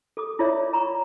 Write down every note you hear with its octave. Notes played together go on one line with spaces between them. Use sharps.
A4 D6 D#6
E4 F4 A#4 C#5 D5 E5
A#5 B5 C#6